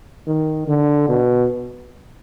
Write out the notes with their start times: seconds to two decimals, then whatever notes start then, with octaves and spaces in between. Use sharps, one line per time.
0.27 D#3
0.68 D3
1.09 B2